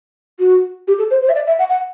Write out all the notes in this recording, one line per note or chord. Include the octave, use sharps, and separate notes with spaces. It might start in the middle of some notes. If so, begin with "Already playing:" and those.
F#4
G4
A4
C5
C5
E5
D5
E5
F#5
F#5